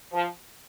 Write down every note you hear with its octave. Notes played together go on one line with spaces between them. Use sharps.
F3